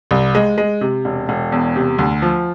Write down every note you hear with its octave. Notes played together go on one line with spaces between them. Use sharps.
C2
G#3
G#3
C3
E1
E1
E2
C3
D2
F3